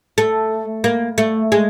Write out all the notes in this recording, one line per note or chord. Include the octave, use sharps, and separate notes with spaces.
A3
A#3
A3
G#3